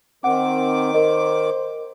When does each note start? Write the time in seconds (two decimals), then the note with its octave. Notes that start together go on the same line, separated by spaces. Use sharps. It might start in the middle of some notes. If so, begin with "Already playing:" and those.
0.24 D#3 C4 F#5 D6
0.94 A#4 C5 D#5